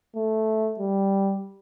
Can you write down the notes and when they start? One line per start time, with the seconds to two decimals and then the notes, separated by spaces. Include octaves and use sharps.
0.15 A3
0.79 G3